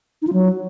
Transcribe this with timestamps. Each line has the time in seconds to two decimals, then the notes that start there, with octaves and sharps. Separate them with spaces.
0.22 D#4
0.27 F4
0.33 F#3